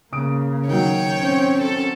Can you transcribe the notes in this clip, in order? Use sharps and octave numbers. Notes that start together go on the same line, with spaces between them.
C#3 A#3 D#6 D7
D#3 F#3 C#5 G5
C4 C#4
A4